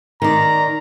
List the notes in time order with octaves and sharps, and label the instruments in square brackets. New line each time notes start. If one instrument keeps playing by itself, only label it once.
[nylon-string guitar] D#3 D5 [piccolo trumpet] A#5